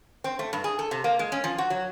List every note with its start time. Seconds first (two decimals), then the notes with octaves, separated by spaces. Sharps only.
0.24 C4
0.39 A3
0.53 G2
0.64 G#4
0.79 A4
0.91 C3
1.04 A#3
1.19 G#3
1.32 C#4
1.44 F3
1.58 F#4
1.70 F#3